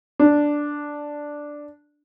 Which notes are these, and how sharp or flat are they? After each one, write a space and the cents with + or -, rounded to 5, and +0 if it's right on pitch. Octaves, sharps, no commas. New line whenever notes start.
D4 +0